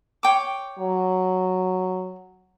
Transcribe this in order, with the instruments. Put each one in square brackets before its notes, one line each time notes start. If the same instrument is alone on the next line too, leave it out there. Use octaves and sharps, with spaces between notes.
[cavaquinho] C#5 G5 D6
[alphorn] F#3